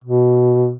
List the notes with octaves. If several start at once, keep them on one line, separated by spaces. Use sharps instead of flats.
B2